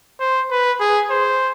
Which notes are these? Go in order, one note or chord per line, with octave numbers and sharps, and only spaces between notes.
C5
B4
G#4
C5